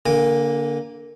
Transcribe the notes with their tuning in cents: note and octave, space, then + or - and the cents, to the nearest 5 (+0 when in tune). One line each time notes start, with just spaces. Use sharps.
D3 -25 A#3 +5 G#5 -30